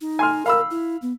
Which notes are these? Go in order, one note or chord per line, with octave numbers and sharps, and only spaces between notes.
D#4
G#5 C6 F6
A#4 F5 B5 E6
E4
B3